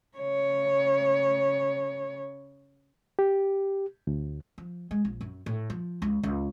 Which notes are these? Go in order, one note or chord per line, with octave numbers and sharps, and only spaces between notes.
C#3 C#5
G4
D2
F3
G#3
A#1
F#2
A2
F3
C#2
C#2